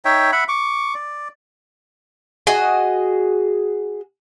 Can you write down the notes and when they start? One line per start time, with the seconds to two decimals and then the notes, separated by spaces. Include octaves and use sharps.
0.05 D#4 C#5 E5 G5
0.32 E5 F#5 B5
0.48 C#6 D6
0.94 D5
2.47 F#4 G#4 D#5